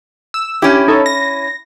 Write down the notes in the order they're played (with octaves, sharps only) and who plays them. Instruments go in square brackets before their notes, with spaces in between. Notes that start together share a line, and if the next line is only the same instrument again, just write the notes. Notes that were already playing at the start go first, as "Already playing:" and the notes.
[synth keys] E6
[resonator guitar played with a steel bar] C#4 E4 [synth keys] G4
[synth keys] D#4 A4 C#5
A#6